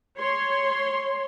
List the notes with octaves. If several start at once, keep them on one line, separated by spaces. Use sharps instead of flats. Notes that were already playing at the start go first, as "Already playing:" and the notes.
C#5 C6